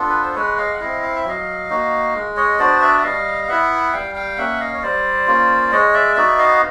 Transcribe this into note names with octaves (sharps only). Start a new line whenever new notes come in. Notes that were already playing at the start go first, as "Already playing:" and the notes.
Already playing: B3 D4 F4 A4
B4
C5
G#3 B4 C#5
D#5 F5
F#5
C4 E4 D#5 F5
F5
E5
F#3 D#5 F5
A#3 D#4 F#4
G#3
C#5 D#5
B3 D4 F#4 C5 D5
D5 E5
E5
G3 D#5 F5
F5
B3 E4 E5 F#5
G3 F5 G5
F5 G5
A#3 C#4 E5 F#5
D#5 F5
C#5
G3 C5 D5
A#3 C#4 F4
G#3 C#5 D#5
D5 E5
B3 D#4 F#4 D5 E5
D#5 F5